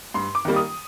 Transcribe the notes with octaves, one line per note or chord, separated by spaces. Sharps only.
G2 C6
D6
D#3 G3 A#3
D#6